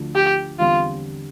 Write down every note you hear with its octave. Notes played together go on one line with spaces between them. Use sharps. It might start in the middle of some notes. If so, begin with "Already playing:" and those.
Already playing: D2 D3 F3 A3
G4
E2 D3 G3 C4 F4